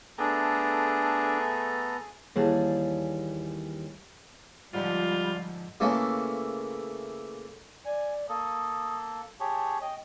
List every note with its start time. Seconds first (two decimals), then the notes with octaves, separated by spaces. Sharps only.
0.18 A3 B3 D4 G#4 A4 A#5
2.36 D#2 E3 G3 G#4 A5
4.74 G#2 D3 F3 G3 F4
5.80 C#3 E3 A3 A#3
7.85 D5 G#5
8.29 A#3 A4 D#6
9.40 G4 G#4 C#5 A5
9.82 D#5 G5